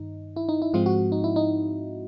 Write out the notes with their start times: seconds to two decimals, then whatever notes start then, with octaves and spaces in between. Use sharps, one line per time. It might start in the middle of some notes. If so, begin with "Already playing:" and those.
Already playing: G2 D#3 D#4
0.36 E4
0.49 D#4
0.62 E4
0.73 G#2 F3 G#3 C4 F4
0.86 F#4
1.12 D#4
1.24 E4
1.36 D#4